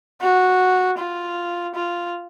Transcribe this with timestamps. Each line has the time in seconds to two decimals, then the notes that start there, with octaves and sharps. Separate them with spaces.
0.21 F#4
0.98 F4
1.75 F4